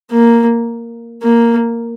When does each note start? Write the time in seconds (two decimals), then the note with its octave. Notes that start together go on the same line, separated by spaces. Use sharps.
0.11 A#3
1.22 A#3